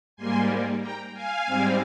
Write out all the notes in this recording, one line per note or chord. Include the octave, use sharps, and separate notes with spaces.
G#2 G3 A#3 G#5 C6
G5 A#5
F5 G#5
G#2 G3 C4